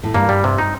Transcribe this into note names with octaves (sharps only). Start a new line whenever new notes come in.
A2
G2 A#3
G3
C3
D#4